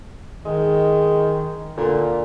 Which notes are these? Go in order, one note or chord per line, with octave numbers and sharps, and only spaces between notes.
D#3 G#3
A#2 D3